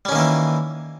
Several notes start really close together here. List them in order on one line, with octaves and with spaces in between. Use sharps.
G3 C#4 D#3 A#3 E3